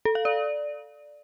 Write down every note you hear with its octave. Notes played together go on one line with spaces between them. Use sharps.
A4
F5
D5